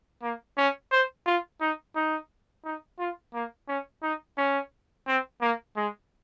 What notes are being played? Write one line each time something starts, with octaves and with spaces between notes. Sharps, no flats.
A#3
C#4
C5
F4
D#4
D#4
D#4
F4
A#3
C#4
D#4
C#4
C4
A#3
G#3